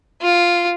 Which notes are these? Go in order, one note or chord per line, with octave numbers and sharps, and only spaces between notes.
F4